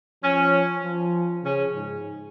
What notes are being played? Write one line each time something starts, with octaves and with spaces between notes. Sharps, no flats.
F3 C#4
F3
C#3 C#4
G#2